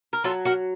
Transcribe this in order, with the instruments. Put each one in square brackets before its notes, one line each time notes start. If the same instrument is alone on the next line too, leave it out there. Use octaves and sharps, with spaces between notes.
[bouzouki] A#4
F#3 F4 A4
F#4 A#4